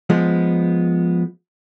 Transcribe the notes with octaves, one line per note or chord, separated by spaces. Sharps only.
F3 G#3 B3